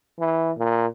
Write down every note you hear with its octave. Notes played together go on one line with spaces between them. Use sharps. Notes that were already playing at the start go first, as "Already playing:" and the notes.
E3
A#2